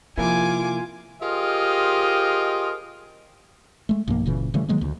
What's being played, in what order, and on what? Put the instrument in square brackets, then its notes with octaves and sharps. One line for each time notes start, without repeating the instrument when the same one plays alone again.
[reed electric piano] C3 A#3 E4 [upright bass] F3 [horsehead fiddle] F4 [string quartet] G#5 D6
[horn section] F4 G4 G#4 A#4 C5 D#5
[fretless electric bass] G#3 A3
B1 G2 F3 A#3
F#1 A#2 C#3 E3
C#3 E3 G3 A3
D#3 F#3 G#3 A#3
D2